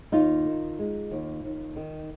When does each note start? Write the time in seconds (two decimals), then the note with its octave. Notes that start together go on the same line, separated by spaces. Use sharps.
0.12 D#2 D#4 F4
0.45 D#3
0.79 G#3
1.11 D#2
1.44 D#2
1.76 D#3